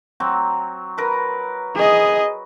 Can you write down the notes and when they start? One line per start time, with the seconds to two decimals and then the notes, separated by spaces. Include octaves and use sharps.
0.20 F#3 C4
0.98 A#4 B4
1.75 G#4 D#5